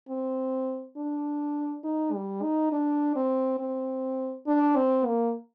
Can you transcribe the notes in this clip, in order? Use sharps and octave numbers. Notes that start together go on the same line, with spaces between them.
C4
D4
D#4
G3
D#4
D4
C4
C4
D4
C4
A#3